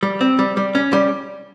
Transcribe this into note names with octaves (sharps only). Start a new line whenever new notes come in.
G3
C4
G3
G3
C#4
G3